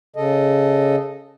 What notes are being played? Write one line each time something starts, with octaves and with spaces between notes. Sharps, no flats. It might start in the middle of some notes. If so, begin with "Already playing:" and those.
C#3 A4 D#5